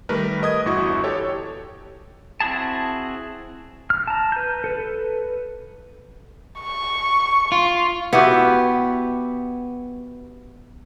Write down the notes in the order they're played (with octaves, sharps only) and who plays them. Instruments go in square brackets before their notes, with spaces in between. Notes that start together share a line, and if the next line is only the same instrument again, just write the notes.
[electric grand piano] D#3 G3 A3 A#4 B4
A#4 D#5 D#6 G#6
G1 E2 E4 F#4 C#6
G4 A4 C#5
[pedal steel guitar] C4 E4 F#4 G#4 A5
F6
A5 A#5
B4 G6
A4 B4
[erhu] C#6
[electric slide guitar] F4
[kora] B3 E4 F#4 G4